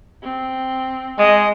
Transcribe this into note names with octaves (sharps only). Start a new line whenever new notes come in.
C4
G#3 D#5